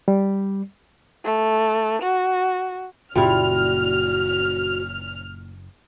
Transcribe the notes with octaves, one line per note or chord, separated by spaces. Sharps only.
G3
A3
F#4
F#1 A#2 G3 E4 F#4 F6